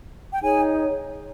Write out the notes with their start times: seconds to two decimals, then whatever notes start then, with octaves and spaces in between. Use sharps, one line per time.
0.32 G5
0.42 D#4 G#4 C#5 G#5